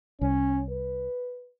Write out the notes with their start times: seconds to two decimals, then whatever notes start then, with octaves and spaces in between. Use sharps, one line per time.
0.21 C2 C#4
0.70 B4